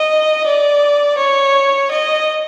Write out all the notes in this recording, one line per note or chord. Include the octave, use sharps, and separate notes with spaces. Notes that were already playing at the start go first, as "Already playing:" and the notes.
Already playing: D#5
D5
C#5
D#5